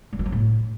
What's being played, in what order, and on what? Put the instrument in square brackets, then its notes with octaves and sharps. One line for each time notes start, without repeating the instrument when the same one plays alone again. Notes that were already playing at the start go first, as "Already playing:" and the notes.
[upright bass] G3
F3
F#3
A2